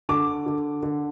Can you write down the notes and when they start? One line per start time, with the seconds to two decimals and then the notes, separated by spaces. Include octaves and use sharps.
0.09 D3 D6
0.46 D3
0.83 D3